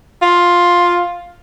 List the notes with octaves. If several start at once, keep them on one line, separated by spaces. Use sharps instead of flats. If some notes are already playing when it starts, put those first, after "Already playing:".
F4